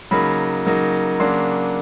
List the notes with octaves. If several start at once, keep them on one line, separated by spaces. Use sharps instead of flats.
C#3 F#3 A#3 D#4 B5
C#3 F#3 A#3 D#4
C#3 F#3 A#3 D4 C6